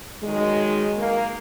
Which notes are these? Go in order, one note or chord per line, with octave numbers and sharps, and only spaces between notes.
D#3 F#3 G#3
A#3